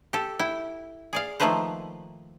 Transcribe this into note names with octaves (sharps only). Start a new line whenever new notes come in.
G4 A4
E4 G5
G#4 D5 F5
D#3 F3 A3 A#3 B4 C5